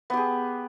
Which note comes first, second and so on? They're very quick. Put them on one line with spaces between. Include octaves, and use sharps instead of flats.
B3 G4 G#4